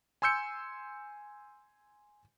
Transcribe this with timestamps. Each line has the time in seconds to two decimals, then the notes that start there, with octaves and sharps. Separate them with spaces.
0.22 G#5 C6 E6 G6 C#7